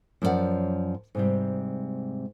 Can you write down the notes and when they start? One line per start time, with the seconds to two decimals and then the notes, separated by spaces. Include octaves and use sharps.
0.22 F#2 F3 C#4 E4 D5 F#5
1.15 G#2 C3 G3